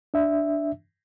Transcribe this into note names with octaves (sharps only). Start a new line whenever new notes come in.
D4 E5